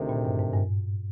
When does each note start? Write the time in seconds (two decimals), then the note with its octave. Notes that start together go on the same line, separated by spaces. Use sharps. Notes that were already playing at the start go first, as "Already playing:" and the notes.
Already playing: D2 C3 D#3
0.09 A#2
0.25 G2
0.39 G#2
0.54 G2